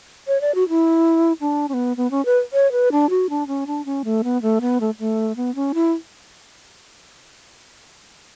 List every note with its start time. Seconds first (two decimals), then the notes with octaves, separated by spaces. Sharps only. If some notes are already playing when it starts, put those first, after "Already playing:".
0.27 C#5
0.41 D5
0.55 F#4
0.69 E4
1.41 D4
1.69 C#4
1.74 B3
1.97 B3
2.11 C#4
2.25 B4
2.53 C#5
2.72 B4
2.92 D4
3.10 F#4
3.30 D4
3.47 C#4
3.67 D4
3.85 C#4
4.05 A3
4.24 B3
4.42 A3
4.61 B3
4.81 A3
5.00 A3
5.37 B3
5.55 C#4
5.74 E4